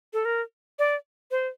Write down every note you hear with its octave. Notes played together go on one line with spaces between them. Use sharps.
A4
A#4
D5
C5